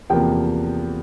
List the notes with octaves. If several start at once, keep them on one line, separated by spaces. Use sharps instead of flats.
E2 C3 F3 A#3 G5